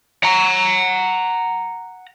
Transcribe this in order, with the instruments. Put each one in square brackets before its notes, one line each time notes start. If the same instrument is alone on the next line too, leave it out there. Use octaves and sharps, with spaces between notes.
[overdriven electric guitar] F#5 A#5